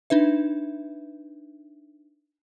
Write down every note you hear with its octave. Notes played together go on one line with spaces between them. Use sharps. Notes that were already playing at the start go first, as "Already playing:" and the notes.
D4 D#4 B4 E5